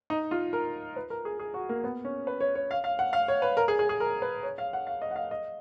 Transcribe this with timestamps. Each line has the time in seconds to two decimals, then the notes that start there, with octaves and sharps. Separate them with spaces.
0.10 D#4
0.31 F4
0.53 A#4
0.96 B4
1.10 A#4
1.25 G#4
1.39 G#4
1.54 F#4
1.69 A#3
1.84 B3
2.05 C#4
2.27 B4
2.40 C#5
2.55 C#5
2.71 F5
2.84 F5
2.99 F#5
3.13 F5
3.28 C#5
3.42 B4
3.57 A#4
3.68 G#4
3.79 G#4
3.89 G#4
4.00 A#4
4.22 B4
4.43 C#5
4.58 F5
4.73 F#5
4.87 F5
5.02 D#5
5.11 F#5
5.16 F5
5.31 D#5